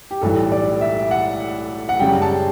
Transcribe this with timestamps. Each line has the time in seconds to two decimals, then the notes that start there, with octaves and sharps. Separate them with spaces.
0.11 G4
0.21 B1 A2 E3 G3 A4
0.52 D5
0.81 E5
1.11 F#5
1.89 F#5
1.99 F#2 C#3 G3 G5
2.22 A5